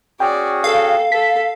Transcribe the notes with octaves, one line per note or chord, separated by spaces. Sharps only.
C#4 F#4 G#4 D5 G5
A4 F5
A4 A5 B6